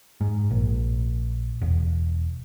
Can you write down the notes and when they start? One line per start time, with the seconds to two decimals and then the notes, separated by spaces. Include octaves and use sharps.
0.21 G#2
0.51 A#1
1.61 E1